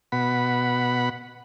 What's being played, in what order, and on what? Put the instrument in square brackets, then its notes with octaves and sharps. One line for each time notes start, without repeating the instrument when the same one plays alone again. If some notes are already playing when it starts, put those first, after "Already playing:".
[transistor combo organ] B2 F#5 B5